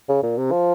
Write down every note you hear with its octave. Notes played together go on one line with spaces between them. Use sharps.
C#3
A#2
C3
F3